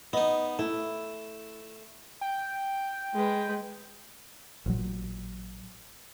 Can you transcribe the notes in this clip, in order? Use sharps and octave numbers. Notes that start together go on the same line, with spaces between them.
B3 D#4 D#5
A3 E4
G5
G#3 B4
A1 A#2 C#3 F#3